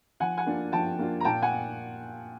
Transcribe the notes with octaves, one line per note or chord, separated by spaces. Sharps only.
F3 F#5 G#5
F#5 G#5
A#3 D4 F4
F3 G5 A5
A#3 D4 F4
A#5
A#2 G5 A5
F#5 G#5